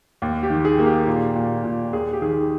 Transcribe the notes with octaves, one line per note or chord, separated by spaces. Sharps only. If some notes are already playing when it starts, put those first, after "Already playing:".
D#2
G4
D#3
G#4
A#3
G4
A#2
A#2
A#2
D#2 G#4
G4
D#3 G#4